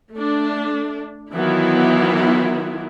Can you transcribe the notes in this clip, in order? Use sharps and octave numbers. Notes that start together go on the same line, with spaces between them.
A3 D4
D#3 E3 F#3 B3 E4 F4